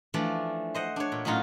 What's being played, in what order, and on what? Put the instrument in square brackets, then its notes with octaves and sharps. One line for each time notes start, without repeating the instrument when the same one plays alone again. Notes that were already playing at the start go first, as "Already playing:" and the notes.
[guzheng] E3 F3 A3 D4 D5
C5 D#5 F#5
D4 C#5
A#2
A2 F#3 C#4 D#4 F4 F#5